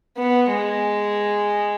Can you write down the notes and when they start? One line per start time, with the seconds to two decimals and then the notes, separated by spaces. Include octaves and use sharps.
0.17 B3
0.50 G#3